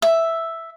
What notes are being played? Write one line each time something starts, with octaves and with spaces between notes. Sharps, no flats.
E5